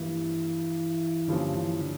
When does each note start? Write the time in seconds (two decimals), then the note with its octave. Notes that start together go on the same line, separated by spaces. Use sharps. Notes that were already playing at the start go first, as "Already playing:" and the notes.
Already playing: G2 E3 F3 A#3 E4
1.28 G2 D3 F3 A#3 C#4 F4
1.54 E3
1.81 D3